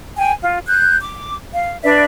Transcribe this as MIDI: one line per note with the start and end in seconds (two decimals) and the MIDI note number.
0.17 0.32 79
0.17 0.32 80
0.41 0.59 65
0.67 0.97 90
0.67 0.97 91
1.02 1.34 86
1.54 1.77 77
1.83 2.04 62
1.83 2.04 71
1.83 2.04 74
1.83 2.04 76